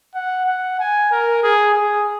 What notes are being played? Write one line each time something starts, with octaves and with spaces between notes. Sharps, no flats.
F#5
F#5
G#5
A#4
G#4
G#4